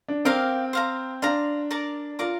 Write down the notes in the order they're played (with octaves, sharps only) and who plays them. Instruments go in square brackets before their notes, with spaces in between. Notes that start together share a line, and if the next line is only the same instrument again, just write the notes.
[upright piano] D4
[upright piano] C4 [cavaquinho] G4 A#4 F5 D6
[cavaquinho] C5 F5 A#5
[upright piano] D4 [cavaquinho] C5 F5 A#5
[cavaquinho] A#4 D5 A#5 D6
[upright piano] F4 [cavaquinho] A#4 D5 A#5 D6